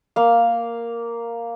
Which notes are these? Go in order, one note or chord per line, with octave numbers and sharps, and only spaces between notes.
A#3 F5